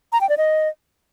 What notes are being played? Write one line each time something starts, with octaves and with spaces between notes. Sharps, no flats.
A#5
G5
D5
D#5